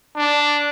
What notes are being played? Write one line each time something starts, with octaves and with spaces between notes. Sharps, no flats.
D4